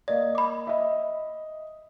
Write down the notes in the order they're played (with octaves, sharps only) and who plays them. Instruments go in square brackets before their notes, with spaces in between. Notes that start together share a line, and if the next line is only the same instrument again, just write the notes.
[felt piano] A#3 D#5 [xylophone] D5
[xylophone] B5 D6
[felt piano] D#5 E5